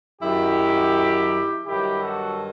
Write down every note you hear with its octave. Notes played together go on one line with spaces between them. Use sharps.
F#2 D#3 F#3 E4 G4
G2 D#3 F#3 E4 G4
F#4 A4